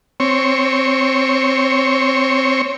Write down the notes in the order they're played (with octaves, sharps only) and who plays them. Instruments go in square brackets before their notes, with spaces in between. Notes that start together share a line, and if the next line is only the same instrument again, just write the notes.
[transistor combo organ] C4 C#5